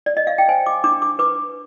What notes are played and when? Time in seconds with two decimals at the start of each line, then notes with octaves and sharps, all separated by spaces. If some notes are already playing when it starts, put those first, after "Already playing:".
0.06 D5
0.17 D#5
0.27 F5
0.38 G5
0.48 C5 G#5
0.66 D6
0.84 D4 D6
1.02 D6
1.19 B4 D6